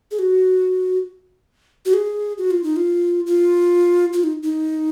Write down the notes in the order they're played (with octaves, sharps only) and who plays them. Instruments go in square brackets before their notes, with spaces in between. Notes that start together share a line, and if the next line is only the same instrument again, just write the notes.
[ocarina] G#4
F#4
F#4
G#4
F#4
F4
D#4
F4
F4
F4
D#4
D#4